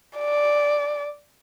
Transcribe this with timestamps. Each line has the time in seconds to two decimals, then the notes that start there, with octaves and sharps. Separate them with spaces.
0.17 D5